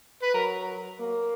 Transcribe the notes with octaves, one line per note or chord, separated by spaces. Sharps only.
B4
F#3 A#4
A#3